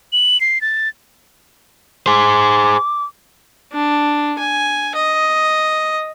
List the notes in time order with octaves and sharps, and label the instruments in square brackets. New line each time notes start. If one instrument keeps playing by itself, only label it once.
[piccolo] F#7
C7
A6
[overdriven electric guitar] G#4 C5 [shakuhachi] D6
[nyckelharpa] D4
G#5
D#5